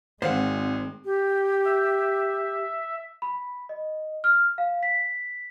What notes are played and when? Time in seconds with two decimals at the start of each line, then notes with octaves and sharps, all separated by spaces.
0.22 G#1 G#3 C4 C5 F5 F#5
1.05 G4
1.65 E5
3.22 B5
3.69 D#5
4.24 F6
4.58 F5
4.83 B6